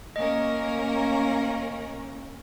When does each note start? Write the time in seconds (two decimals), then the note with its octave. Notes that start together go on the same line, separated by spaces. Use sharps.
0.16 A#3 C#4 A#4 D#5